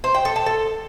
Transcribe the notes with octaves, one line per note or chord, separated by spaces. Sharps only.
C5
G5
A4
A5
A4